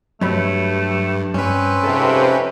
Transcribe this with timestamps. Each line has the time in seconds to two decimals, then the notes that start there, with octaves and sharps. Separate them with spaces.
0.21 G2 F#3 A3 C#5 B5
1.34 G2 C4 C#4 B4
1.84 F2 G#2 C3 A4